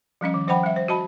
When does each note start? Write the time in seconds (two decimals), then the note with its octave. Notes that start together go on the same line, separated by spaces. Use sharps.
0.21 F3 G3 C#4 D#5
0.34 D#3
0.47 F3 C5 D#5 F#5 G5 B5
0.63 G3 E5
0.76 C5
0.88 F#4 D#5 A5 B5